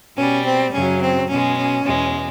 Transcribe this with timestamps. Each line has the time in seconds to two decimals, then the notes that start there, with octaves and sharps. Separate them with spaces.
0.17 B2 G3 C#4
0.45 C4
0.73 F#2 C#3 F#3 C#4
1.02 C4
1.29 B2 G#3 C#4
1.58 C#4
1.85 E2 B2 G#3